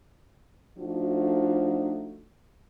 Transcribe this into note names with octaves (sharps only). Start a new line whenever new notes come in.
F3 A3 D4 D#4 F#4